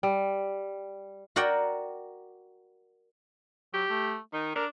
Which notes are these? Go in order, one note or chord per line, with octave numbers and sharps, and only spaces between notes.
G3
F#4 A#4 D5 F#5 G5
F#3 G4
A3
D#3 D#4
D4 A#4